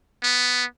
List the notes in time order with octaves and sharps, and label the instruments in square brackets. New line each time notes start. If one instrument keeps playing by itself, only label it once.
[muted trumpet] B3